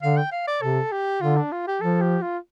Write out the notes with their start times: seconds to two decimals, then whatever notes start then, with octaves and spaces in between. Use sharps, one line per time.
0.02 D3 F5
0.17 G5
0.32 F5
0.47 D5
0.62 C3 A4
0.92 G4
1.21 D3 F4
1.37 D4
1.52 F4
1.67 G4
1.81 F3 A4
2.01 G4
2.22 F4